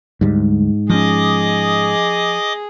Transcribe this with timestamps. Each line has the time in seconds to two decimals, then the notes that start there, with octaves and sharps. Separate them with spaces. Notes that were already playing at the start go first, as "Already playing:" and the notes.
0.21 D2 G#2 G3 G#3
0.89 F3 C#4 G#4 D#5 D6 D#6